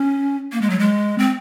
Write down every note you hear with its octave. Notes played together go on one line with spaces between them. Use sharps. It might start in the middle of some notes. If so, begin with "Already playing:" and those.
Already playing: C#4
A#3
G#3
F#3
G#3
C4